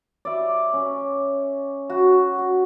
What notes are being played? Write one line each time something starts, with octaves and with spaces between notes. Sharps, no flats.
D5 E5
C#4
F#4
F#4